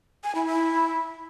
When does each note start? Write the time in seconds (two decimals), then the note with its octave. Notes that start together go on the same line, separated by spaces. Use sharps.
0.24 G#5
0.35 E4
0.46 E4